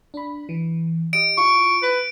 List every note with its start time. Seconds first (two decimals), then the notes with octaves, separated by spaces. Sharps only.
0.14 D4 B5
0.49 E3
1.13 G4 D#5 D7
1.38 E4 F4 C#6
1.83 B4